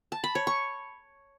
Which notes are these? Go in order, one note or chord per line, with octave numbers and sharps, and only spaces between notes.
A5
B5
C#5
C#6